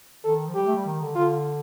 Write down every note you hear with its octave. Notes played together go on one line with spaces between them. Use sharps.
D#3 A4
F3
G3 G4
A3
G3
D#3
D3
D3 F4